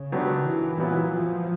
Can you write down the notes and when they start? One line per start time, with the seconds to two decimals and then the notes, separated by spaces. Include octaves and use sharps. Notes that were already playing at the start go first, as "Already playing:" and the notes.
Already playing: C#3
0.12 D#3 F#3 B3 D4 G4
0.45 E3
0.78 A#2 F#3 B3 E4
1.10 F3